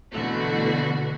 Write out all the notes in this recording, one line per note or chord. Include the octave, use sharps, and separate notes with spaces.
B2 D3 E3 A3 F#4